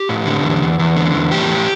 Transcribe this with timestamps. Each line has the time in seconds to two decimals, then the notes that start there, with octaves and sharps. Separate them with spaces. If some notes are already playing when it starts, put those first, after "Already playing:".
Already playing: G4
0.09 A2
0.26 D3
0.43 E2
0.62 E2
0.79 E2
0.96 D3
1.14 E2
1.31 A2 G4
1.48 A2